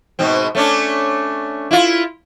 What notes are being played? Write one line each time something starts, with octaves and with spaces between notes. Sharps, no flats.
G#2 B2 C4
A3 C#4 D4
E4 F4